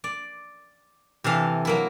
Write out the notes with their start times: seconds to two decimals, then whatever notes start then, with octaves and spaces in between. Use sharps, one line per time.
0.04 D5
1.24 C3 E3 A4 F5
1.65 F#3 A#3 E4